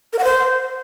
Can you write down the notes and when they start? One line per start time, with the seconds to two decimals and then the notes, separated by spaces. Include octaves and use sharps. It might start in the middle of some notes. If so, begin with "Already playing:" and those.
0.13 A#4
0.19 F#5
0.24 C5